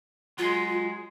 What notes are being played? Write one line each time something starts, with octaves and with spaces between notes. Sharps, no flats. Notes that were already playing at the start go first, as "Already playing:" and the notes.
F#3 G#3 F4